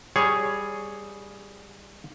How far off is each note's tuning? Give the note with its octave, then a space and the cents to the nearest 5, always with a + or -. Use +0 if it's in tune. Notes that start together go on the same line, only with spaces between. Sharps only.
G3 +15 G#4 +0 C#5 +0